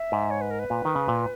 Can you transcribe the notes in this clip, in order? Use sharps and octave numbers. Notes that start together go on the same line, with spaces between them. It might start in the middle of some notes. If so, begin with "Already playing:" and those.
Already playing: E5
G#2
C#5
B4
A#4
B4
A#2
D#3
C#3
A#2